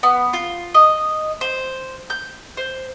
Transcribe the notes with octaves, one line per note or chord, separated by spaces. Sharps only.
B3
F4
D#5
C5
G6
C5